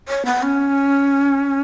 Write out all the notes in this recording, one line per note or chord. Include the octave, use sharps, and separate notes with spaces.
C#5
B3
C#4